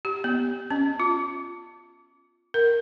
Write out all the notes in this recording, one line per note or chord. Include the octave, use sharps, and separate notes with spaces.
G4
B3
C#4
F4
A#4